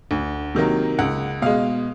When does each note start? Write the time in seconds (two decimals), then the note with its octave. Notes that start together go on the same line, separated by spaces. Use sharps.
0.11 D2
0.55 C3 D#3 F#3 A#3
0.99 C#2 F#5
1.42 B2 G#3 F5